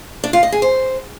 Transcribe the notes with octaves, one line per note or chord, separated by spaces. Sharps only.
D4
F4
D#5
G#4
C5